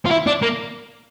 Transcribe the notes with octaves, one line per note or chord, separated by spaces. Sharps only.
F4
E4
D4
A#3